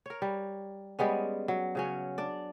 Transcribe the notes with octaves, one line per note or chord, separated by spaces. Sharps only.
A#4 C#5
G3
G3 G#3 B3 C#4
F#3
C#3 F#3 C#4
D4 D5